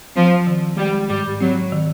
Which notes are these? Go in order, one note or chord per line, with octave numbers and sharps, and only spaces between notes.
F3 C4
D#3
G3 G#3
G#2 G3
F#3 C4
D#3